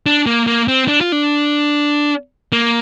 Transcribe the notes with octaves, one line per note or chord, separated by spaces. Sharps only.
D4
A#3
A#3
C4
D4
F4
D4
A#3